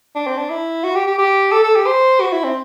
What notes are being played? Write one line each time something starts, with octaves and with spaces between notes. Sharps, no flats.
D4
C4
D4
E4
F#4
G4
G4
G4
A4
A4
G4
C5
F#4
E4
C4